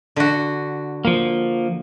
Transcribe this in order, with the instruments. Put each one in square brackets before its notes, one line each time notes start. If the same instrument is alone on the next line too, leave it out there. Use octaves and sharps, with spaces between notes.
[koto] D3 F#4
[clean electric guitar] F3 A#3